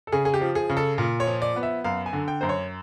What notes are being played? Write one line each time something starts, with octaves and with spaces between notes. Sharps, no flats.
A4
C#3 G#4
G#4
G4
F3
G#4
C#3
A4
A#2
C#5
F3
D5
B3
E5
F#2 F5
G#5
D3
G5
F#2 C5
C#5